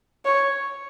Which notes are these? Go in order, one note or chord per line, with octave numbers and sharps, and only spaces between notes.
C#5